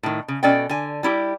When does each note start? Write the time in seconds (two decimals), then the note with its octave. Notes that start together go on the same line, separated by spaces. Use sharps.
0.03 A2 D#3
0.28 C#3
0.43 B2 C#4 A4 D5 D#5 G5
0.69 D3 G#5
1.03 G3 E4 G4